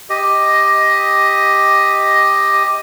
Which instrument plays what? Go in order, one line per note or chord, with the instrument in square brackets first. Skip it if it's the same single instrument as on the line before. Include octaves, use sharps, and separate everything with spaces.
[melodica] G4 D#5